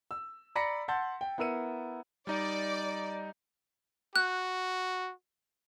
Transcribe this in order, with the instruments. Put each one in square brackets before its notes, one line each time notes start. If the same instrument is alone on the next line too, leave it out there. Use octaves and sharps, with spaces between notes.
[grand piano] E6
D5 A#5 B5 A#6 B6 C#7
F#5 A5 C6 E6 G6 A6
G5
B3 E4 A#4 E6 C#7 D#7
[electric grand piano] G3 D#4 D#5 [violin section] D5
[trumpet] F#4 [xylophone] F#6